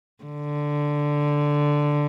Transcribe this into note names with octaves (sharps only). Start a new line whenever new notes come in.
D3